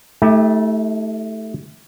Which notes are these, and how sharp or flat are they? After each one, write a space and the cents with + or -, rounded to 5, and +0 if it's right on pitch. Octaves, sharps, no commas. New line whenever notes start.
A3 +0 E4 -45 G4 +20